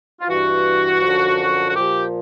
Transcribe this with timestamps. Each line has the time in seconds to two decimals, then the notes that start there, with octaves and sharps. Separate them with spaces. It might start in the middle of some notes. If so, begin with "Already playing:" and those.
0.20 F4
0.29 G2 E3 F#4
1.02 F#2 D3 F3
1.68 F#4
1.75 A#2 F3 G4